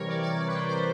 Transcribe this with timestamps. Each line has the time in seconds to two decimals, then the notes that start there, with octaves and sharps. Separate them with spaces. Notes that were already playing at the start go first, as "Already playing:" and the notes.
Already playing: C3 E3 G3 A#4 C#5
0.08 D5
0.23 D5
0.38 D5
0.47 B4
0.54 C5
0.69 C5